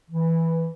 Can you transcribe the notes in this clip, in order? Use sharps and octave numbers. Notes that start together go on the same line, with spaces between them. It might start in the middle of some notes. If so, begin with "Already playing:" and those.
E3